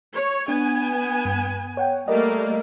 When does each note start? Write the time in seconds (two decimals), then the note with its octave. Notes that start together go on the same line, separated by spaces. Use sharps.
0.16 C#5
0.48 B3 D4 G#5 G#6
1.25 G2
1.77 C#5 F#5 G5
2.08 G3 A3 A#3 A#4 D5 D#5